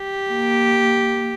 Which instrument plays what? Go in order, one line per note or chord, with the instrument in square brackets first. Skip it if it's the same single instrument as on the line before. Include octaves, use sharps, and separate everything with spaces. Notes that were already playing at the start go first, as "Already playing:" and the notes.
Already playing: [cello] G4
[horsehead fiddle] A#3